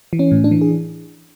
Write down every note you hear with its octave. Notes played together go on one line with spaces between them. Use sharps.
E3
C#4
A2
D4
E3
G#4